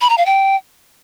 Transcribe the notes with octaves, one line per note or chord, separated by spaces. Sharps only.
B5
A#5
F5
G5